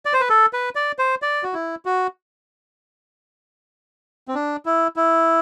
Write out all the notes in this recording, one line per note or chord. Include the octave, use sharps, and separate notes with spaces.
D5
C5
B4
A4
B4
D5
C5
D5
F#4
E4
F#4
C4
D4
E4
E4